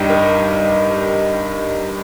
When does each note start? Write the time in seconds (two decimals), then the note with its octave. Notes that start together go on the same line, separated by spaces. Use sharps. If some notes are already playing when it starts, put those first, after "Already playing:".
Already playing: G2 G3 D#4 G4 D#5 G5
0.10 A#4
0.91 A#4